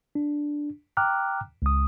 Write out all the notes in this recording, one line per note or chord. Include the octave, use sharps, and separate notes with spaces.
D4
G5 A#5 D6 F6 F#6
C#2 D#6